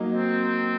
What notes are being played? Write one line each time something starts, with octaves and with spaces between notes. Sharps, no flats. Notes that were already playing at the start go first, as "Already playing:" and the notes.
Already playing: F#3 A#3 D#4
C4